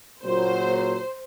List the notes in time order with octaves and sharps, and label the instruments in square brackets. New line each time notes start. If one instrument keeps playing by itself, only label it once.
[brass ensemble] A#2 C#3 F#3 [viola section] C5